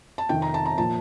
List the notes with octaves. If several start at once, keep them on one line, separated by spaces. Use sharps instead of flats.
A5
F2 C3 D#3 G5
A#5
A5
A#5
A#2 F3 A5